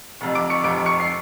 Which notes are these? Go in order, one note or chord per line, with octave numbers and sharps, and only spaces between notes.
F1 F2 C3
D6 D7
C#6 C#7
F1 F2 C3 D6 D7
C#6 C#7
C7